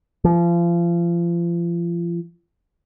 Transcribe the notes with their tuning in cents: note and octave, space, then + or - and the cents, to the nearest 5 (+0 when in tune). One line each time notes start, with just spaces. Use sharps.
F3 -35